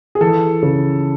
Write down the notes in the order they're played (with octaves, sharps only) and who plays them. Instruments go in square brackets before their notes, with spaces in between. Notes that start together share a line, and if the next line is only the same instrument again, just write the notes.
[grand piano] G#4
E3 A4
C#3